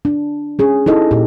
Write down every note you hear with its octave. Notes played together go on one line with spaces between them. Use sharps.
D4
C#4 G#4
D#4 E4 A4 D#5
A#2 G4